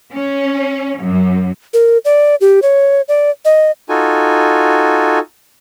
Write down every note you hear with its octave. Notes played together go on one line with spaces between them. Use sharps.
C#4
F#2
A#4
D5
G4
C#5
D5
D#5
D#4 F4 F#4 A4 G#5